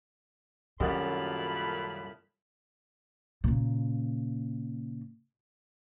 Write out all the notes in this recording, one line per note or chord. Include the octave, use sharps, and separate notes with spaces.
C2 F#2 A#2 D#3 A4 B5
A#2 C#3